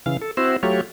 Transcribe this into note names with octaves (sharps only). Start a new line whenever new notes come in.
C#3 E3 F5
A4
C4 E4 F#4 C5
F#3 A3 F4 G4 C#5